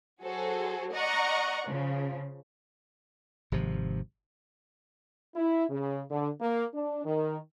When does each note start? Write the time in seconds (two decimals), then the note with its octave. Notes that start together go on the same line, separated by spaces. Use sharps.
0.22 F#3 F#4 G#4 A4 C5
0.92 D5 D#5 F#5 A#5 C#6
1.68 C#3 F3
3.52 G#1 C3 F3
5.36 E4
5.69 C#3
6.10 D3
6.40 A#3
6.73 D4
7.05 D#3